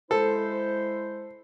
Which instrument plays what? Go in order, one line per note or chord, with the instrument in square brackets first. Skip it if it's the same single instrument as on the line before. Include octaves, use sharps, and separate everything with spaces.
[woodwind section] G#3 E4 C5 [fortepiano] A4